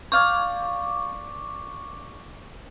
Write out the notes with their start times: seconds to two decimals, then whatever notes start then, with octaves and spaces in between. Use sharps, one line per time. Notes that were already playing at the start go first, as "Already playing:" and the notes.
0.12 D5 F5 C#6 D6